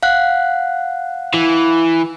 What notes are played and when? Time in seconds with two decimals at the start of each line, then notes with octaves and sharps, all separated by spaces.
0.03 F5 F#5 F#6
1.34 E3